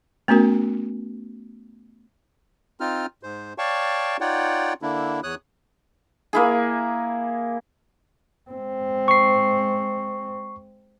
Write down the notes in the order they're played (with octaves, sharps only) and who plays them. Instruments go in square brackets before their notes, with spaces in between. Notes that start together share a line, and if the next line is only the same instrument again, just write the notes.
[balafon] A3 B3 C#4 F#4 A#4
[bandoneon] C4 D#4 F4 F6
G#2 C5
C#5 D5 F5 G5 A5 C#6
D#4 F4 C#5 D5 F#5 G5
D3 A#3 D4 E4
E2 C#5 D#6 F#6
[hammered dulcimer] A#3 E4 G#4
[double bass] G#3 C4
[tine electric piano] C#6 C7